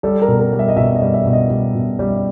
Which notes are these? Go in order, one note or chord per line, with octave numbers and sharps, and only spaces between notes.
G3 A4
A#4
B2
A#4
G3
E5
D#5
B2 E5
D#5
G3
E5
B2
D#5
G3
B2
G3